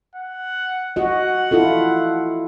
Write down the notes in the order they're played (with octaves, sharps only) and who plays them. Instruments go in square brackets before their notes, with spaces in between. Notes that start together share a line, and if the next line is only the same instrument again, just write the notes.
[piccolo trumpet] F#5
[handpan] F#4 D#5 [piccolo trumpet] F#5
[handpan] E4 F4 A4